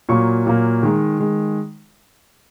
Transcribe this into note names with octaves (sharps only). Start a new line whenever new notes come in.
A#2 F#3 A#3 C#6
A#2 F#3 A#3
D#3 G#3
D#3 G#3